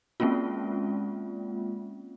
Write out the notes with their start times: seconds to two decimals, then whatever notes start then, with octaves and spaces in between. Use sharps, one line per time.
0.20 G#3 A#3 C4 C#4 F4